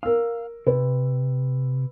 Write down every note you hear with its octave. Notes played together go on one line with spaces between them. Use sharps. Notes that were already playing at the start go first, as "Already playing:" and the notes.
A#4 F5 E6
C3 B4